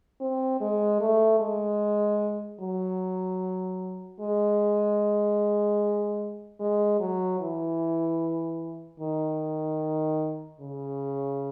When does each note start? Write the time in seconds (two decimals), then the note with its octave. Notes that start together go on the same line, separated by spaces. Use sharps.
0.21 C4
0.60 G#3
1.01 A3
1.40 G#3
2.60 F#3
4.20 G#3
6.60 G#3
7.00 F#3
7.40 E3
9.00 D#3
10.61 C#3